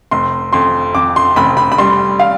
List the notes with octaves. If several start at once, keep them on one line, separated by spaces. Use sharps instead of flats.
F1 C6
F2 C6
F2 D6
C6
F1 B5
B5
B5
G3 C6
F5